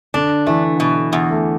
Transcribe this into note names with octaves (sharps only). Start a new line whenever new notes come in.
D3 D4
E3 A3
B2
E2
A3